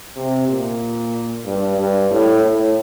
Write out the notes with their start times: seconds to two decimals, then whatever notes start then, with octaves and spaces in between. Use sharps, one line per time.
0.16 C3
0.48 A#2
1.45 G2
1.78 G2
2.10 A2
2.42 A2